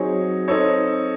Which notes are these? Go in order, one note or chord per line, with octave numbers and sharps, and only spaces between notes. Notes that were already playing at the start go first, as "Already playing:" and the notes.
Already playing: F#3 C4 D#4 G#4 C#5
C4 D#4 A4 C#5